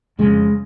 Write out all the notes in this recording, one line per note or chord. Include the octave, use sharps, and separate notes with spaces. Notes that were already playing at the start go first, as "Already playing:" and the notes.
F2 C#3 G#3